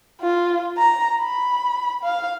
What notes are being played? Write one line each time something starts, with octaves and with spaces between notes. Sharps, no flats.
F4
A#5
B5
F5